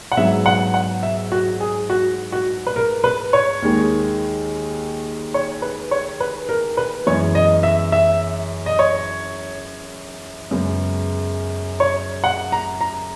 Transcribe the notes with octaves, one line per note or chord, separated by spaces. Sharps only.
F#5
G#2 F#3 B3 E5
F#5
F#5
E5
F#4
G#4
F#4
F#4
B4
A#4
B4
C#5
D#2 D#3 G#3
C#5
B4
C#5
B4
A#4
B4
F#2 E3 G#3 B3 C#5
D#5
E5
E5
D#5
C#5
F#2 C#3 G#3 B3
C#5
F#5
A#5
A#5